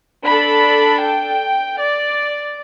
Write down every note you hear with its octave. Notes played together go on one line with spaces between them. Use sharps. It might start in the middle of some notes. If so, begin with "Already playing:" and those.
D4 A4 B5
G5
D5